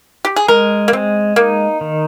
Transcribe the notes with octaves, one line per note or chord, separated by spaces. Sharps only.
G4
G#4
G#3 A#4
A#3
G#3 C4
A#3 D#4
D#3